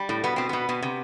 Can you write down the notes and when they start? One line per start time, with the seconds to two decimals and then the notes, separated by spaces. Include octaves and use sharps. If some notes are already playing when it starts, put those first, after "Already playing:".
Already playing: G3
0.09 A2
0.24 B2 B3
0.36 B2 C4
0.49 B2 B3
0.69 B2
0.82 C3